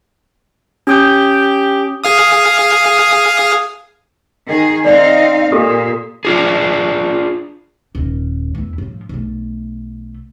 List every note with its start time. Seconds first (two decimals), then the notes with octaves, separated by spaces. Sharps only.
0.87 C#4 G4 D#6 G6
2.04 G#4 F5 D#6
4.47 D#3 G#4
4.85 C4 D#4 D5 F5
5.52 A#2 G4 A4 D#6
6.25 D4 F4 G#4
7.95 D#1 D#3
8.55 E2 E4
8.78 A2 F3
9.09 B1 A3